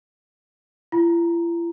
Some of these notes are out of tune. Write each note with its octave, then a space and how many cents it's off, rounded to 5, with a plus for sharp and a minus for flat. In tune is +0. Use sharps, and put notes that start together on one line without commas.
E4 +45 A#5 +0